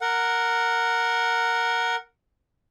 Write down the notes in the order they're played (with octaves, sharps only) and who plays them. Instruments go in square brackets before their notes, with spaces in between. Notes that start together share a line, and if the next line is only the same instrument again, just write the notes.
[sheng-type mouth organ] A#4 F#5